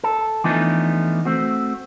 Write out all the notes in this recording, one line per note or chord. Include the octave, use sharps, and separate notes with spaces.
A4
E3 F3 A3 B3 D4 D#4
A3 C4 F#4